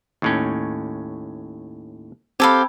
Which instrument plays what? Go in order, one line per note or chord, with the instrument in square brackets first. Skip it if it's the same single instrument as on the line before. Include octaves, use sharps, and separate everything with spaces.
[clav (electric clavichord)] D#2 A2 C#4
[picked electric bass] C4 [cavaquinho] G4 A4 F5 [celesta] B5 E6 G#6